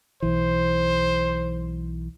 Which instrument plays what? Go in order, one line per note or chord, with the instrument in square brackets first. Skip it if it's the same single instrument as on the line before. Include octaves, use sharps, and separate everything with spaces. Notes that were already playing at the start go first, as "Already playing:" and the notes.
[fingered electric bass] B1 E3 [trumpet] C5